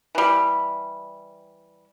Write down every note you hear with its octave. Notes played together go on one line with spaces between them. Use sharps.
E3 G3